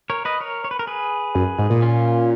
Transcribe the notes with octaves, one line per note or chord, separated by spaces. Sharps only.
A#4 C#5
B4 D#5
A#4 C#5
C#5
B4
A#4
G#4 B4
F#2
G#2
A#2
C#4 F4